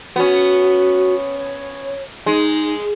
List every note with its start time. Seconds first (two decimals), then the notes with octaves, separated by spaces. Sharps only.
0.16 B3 C#4 F#4
1.37 C#5
2.26 G#3 D#4